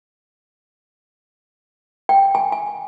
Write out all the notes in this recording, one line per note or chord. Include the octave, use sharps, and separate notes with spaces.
G5
G#5
G#5